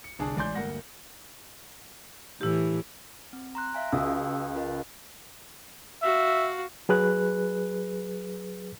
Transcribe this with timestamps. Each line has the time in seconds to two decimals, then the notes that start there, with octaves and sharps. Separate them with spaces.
0.04 C#7
0.19 G1 C2 D4 G#4 A5
0.37 A1 G#3 D5 G#5 C6 G6
0.55 D2 G2 A#3 F#5 A#6
2.41 A2 E3 E4 G4
3.33 C4
3.55 A#5 C6 F#6
3.74 E5 F5 G#5
3.92 C#2 F#4 D#6 E6
4.55 F4 A#4 D#5
6.03 F#4 E5 F5
6.89 F#3 G#4 B4 F#6